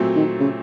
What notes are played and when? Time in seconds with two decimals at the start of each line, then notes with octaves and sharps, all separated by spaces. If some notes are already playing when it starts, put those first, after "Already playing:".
Already playing: A#2 F#3 A3 C4
0.16 D#3
0.40 C#3